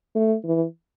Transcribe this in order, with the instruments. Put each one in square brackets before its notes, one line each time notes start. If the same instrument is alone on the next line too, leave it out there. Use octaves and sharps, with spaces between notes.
[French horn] A3
E3